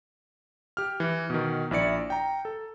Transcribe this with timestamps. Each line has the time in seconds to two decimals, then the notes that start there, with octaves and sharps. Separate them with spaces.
0.77 G4 F6
1.00 E3
1.30 B2 D#3
1.71 A#1 E4 D5 C#7
2.10 G5 A#5
2.45 A4